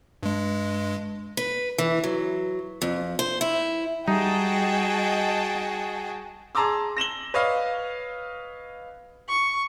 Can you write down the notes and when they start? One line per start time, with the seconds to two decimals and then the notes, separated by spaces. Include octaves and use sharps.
0.23 G2 G#3
1.37 B4
1.78 E3
2.04 F#3
2.82 F2
3.19 C5
3.41 E4
4.08 G3 D#4 F#4 G#4 D#5 G5 A5
6.55 G#4 A5 A#5 C6 D6 E6
6.97 A#6 E7 F#7 G7
7.34 B4 C#5 D#5 F5
9.29 C#6